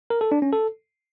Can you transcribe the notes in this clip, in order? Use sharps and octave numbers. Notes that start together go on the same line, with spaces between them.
A#4
A4
D4
C#4
A4